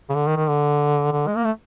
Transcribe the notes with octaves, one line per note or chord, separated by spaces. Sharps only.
C#3
D3
D#3
D#3
D3
D3
G#3
A#3
A3